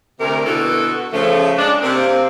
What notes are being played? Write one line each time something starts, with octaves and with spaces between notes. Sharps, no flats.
D2 C3 A#4
B2 D3 B3 E4 F#4 A4
C#3 F3 A3
G#3 D4
C3 A#3 C4